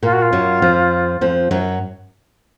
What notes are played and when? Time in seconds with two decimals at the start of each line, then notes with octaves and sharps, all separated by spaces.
0.03 A#2 A#3 F4
0.12 F#4
0.22 F4
0.33 F#2 F#3
0.62 F2 F3
1.21 F2 F3
1.51 F#2 F#3